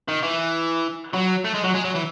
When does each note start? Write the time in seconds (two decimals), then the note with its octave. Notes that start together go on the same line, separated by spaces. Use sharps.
0.08 D#3
0.23 E3
1.13 F#3
1.44 A3
1.54 G#3
1.64 F#3
1.74 G#3
1.84 F#3
1.95 E3